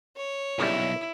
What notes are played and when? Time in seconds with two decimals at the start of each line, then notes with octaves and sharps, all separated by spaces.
0.16 C#5
0.59 B1 A#2 C#3 G3 E4